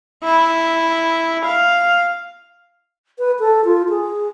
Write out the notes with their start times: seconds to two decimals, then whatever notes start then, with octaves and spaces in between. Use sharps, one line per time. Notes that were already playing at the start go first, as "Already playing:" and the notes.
0.24 E4
1.45 F5
3.18 B4
3.39 A4
3.65 F4
3.89 G#4